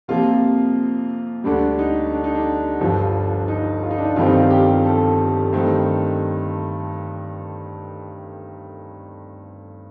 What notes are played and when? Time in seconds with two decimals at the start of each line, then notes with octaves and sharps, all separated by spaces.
0.08 F2 C3 F3 A#3 F4
1.44 D2 D3 G3 D4
1.79 D#4
2.13 D4
2.24 D#4
2.35 D4
2.81 G1 G2 F3
3.48 D#4
3.83 F4
3.91 D#4
3.98 D4
4.05 D#4
4.16 G1 F2 D#3 G3 C4 F4
4.27 D#4
4.38 F4
4.50 G4
4.85 A4
5.53 G2 D#3 A3 C4